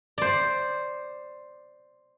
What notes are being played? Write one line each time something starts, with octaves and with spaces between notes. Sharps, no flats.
C5 D5